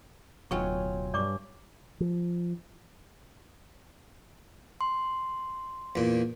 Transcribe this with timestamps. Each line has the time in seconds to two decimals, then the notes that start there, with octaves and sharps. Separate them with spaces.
0.51 D1 B1 F#3 F4 C#5 G5 G#5 C#6
1.14 G2 D5 C#6 D6
2.00 F3
4.81 C6
5.96 E2 A#2